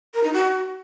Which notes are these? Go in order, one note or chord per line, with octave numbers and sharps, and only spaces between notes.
A#4
D#4
F#4